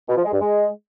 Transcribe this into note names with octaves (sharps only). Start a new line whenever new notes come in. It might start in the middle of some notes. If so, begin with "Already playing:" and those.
B2
F3
G#3
G2
G#3